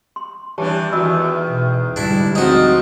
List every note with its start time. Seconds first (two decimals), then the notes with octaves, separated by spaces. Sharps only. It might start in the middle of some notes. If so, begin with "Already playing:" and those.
0.16 C6
0.58 E3 G3 D4 G4 C#5 A5
0.93 E2 D#3 F#4 D#5 E6
1.50 B2
1.96 D2 G3 G#3 D4 E4
2.35 F3 C4 D#4 F#4